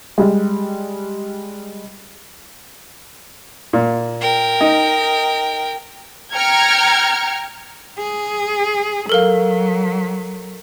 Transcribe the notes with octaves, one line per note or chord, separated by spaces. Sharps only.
G3 G#3
A#2
A#4 G5
D#4
G5 A#5 F6 G#6 C#7
G#4
F#3 A4 A#4 F5